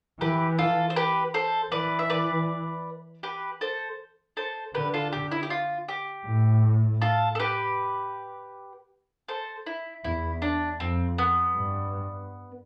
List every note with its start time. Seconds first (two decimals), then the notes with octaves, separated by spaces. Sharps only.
0.20 E3 G4 B4
0.58 F4 A4
0.90 C5
0.96 G4 B4
1.34 A4 C5
1.72 E3 B4 D5
1.99 E5
2.10 B4 D5
3.23 G4 B4
3.61 A4 C5
4.37 A4 C5
4.75 D3 G4 B4
4.94 F4 A4
5.13 G4
5.31 E4
5.43 G4
5.50 F4
5.88 G4
6.26 A2
7.02 F4 A4
7.35 A4
7.39 G4 B4
9.28 A4 C5
9.66 E4
10.04 E2 E4
10.42 D4
10.80 F2 C4
11.18 B3
11.56 G2